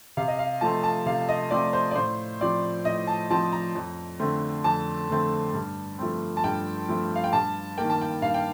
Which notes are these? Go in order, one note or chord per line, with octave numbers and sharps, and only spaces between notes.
C3 F5
D#5
F5
F3 A3 C4 A5
A5
C3 F5
D#5
F3 A3 C4 D5
C5
D5
A2 C5
F3 C4 D5
A2 D#5
A5
F3 C4 A5
A#5
F2
D3 A3 C4
F2 A5
D3 A3 C4
G2
F3 A3 C4
A5
G2 G5
F3 A3 C4
F5
G5
G2 A5
D#3 A#3 G5
A5
G5
G2 F5
G5